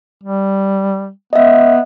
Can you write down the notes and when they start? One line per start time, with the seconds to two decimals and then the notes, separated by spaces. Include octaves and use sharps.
0.23 G3
1.33 B3 D#5 E5